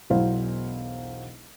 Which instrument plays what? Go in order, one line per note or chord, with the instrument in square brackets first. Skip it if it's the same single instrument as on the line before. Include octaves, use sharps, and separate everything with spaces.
[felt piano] E1 B1 F#3 E4 C5 F5